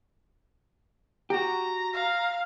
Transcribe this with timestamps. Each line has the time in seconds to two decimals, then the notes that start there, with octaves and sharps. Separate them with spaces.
1.30 F#4 G4 A#5
1.94 F5